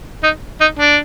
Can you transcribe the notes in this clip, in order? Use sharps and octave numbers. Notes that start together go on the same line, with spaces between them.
D#4
D#4
D4